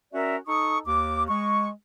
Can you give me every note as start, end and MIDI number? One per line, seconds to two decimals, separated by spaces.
0.13 0.36 61
0.13 0.36 66
0.13 0.36 70
0.13 0.36 74
0.13 0.36 76
0.47 0.78 63
0.47 0.78 69
0.47 0.78 85
0.47 0.78 87
0.86 1.24 39
0.86 1.24 86
1.28 1.68 56
1.28 1.68 85